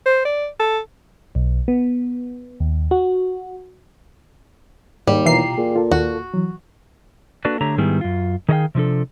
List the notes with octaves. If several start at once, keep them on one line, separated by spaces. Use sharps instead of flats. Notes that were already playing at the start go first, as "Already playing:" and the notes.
C5
D5
A4
B1
B3
D#2
F#4
D#2 G#2 G3
B2 E3 F4 A#5 C7
A#2 G#4
F4 A4
D#2 F#4
E3 F#3
A#3 D4 F#4 A4 B4 D5
D3 A3 G4 C#5 A#5
G#2 D#3 G3 B3 E4 G#4
F#2 F4
D#3 G#4 C#5 D#5 F5 G5
C3 F3 D4 A4